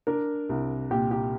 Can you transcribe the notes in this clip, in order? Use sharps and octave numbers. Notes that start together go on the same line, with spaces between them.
D4 A#4
C2
A#2 G4
G4